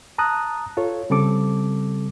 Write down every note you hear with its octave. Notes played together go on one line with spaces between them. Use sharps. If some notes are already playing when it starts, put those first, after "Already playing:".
A5 A#5 D#6 F#6
F4 A4 C#5
C#3 G3 C4 A4 D6